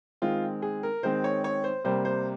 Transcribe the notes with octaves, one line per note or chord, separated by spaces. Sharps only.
D#3 G#3 C4 F4
G#4
A#4
D#3 G#3 C4 C5
C#5
C#5
C5
C3 G3 A#3 C5
C5